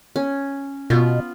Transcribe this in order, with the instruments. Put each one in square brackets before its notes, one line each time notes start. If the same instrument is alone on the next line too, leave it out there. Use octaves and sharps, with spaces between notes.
[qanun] C#4
[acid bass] B2 [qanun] B3 F4